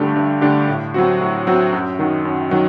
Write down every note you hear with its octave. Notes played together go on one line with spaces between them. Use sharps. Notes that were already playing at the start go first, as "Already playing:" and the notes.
Already playing: G2 D3 A3 D4 G4
G2
D3 A3 D4 G4
A2
F#3 C4 F#4
A2
F#3 C4 F#4
F#2
D#3 F#3
F#2
D#3 F#3